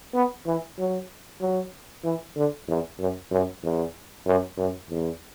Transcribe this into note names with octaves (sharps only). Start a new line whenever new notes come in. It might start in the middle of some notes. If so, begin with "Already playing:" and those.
B3
E3
F#3
F#3
E3
D3
E2
F#2
F#2
E2
F#2
F#2
E2